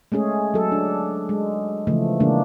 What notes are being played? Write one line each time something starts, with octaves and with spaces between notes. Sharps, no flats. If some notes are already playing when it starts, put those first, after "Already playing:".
G#3 A3 C#4 G#4
F#3 A4
D4
G#3
C#3 E3 F3 A3
C#3 E3 G#3 A#3 D4